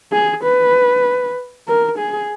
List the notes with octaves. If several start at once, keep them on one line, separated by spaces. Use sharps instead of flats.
G#4
B4
A#4
G#4